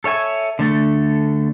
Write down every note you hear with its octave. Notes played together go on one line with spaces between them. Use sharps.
A4 C#5 E5 G#5
D3 A3 A4